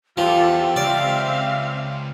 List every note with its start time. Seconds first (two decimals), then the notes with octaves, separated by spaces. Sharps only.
0.17 E2 F3 F4 G4 A4 G5
0.76 C#2 C4 D5 E5 F5